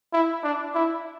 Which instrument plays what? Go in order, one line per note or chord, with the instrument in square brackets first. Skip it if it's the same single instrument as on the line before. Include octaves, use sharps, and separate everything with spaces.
[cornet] E4
D4
E4